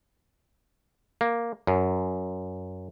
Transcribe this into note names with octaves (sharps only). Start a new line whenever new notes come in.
A#3
F#2